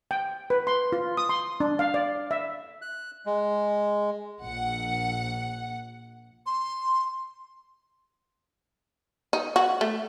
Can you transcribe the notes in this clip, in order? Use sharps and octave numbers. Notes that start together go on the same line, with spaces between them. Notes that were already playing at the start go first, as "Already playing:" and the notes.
G5
B4
C6
F4
D#6
C6
D4
F5
D5
E5
F#6
G#3
A#1 F#5
C6
D#4
F#4
A3